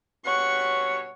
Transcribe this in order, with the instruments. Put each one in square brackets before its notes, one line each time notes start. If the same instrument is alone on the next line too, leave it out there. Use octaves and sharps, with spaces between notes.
[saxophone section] G2 B2 C#5 [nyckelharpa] F#5 C#6